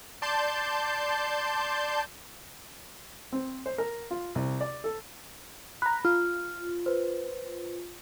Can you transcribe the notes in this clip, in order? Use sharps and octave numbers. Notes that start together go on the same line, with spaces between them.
D5 A5 C6 G6
C4
C5
A#4
F4
C2
D5
A4
A#5 B5 F#6
F4 F6
B4 C5